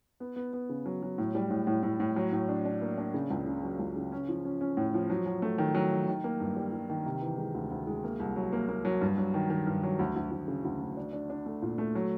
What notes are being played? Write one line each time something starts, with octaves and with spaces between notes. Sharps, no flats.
B3
B3
B3
C#3
F#3
F#3
A2
G3
A2
A2
A2
A2
F#3
A2
D4
D4
A#3
D4
C#3
C#2
C#3
F#3
C#2
C#3
C#4
F3
C#4
C#4
A2
F3
F#3
F#3
A3
D#3
F#3
D#3
D#3
A#3
G2
G3
G3
D#3
C3
E3
G#3
D2
D2
G#3
A#3
C2
F#3
A#3
A#3
F#3
G2
F#3
D#3
D#3
G2
F#3
D2
D2
D2
C#3
D2
D2
D4
D4
D4
A3
A#2
A3
F#3